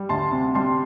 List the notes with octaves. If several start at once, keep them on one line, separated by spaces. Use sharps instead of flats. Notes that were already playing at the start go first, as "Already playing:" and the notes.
Already playing: G3
D2 A5 C6
C3
G3 A5 C6